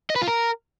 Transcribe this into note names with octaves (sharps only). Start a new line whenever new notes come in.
D#5
B4
F4
A#4